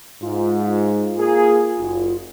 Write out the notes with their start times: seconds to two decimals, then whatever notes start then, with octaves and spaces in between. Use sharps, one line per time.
0.22 G#2 F4
1.17 A#3 G#4
1.78 F#1